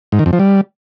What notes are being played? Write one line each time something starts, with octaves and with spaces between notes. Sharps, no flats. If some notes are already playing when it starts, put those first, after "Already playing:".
G#2
D#3
F2
F3
G3